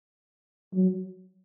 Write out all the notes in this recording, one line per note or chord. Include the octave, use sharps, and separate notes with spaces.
F#3